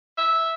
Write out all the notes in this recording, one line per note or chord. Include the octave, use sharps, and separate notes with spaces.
E5